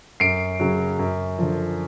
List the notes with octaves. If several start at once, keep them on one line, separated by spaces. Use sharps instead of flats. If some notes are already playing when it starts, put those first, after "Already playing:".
F#2 C7 D7
C#3 F#3
F#2
D3 F3